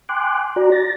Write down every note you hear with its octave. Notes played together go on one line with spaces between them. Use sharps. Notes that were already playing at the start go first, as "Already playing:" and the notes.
G5 G#5 C6 D6 F#6
F#4 D5 A#5
A6 A#6